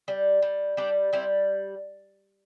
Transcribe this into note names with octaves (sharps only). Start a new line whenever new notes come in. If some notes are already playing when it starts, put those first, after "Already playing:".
G3
G3
G3 D4 G4
G3 C4 E4